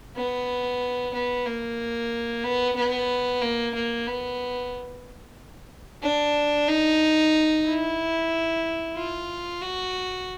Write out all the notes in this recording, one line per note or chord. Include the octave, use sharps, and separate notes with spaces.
B3
B3
A#3
B3
B3
A#3
A#3
B3
D4
D#4
E4
F4
F#4